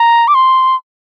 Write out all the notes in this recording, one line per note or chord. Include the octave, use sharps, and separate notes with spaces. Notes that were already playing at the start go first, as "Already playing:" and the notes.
Already playing: A#5
D6
C6